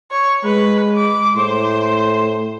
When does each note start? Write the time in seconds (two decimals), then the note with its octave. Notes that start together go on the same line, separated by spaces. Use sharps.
0.11 C#5
0.44 G#3 B4
0.96 D6
1.36 A2 C5